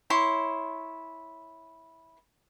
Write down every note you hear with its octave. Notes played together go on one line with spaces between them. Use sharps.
E4 C#5 C6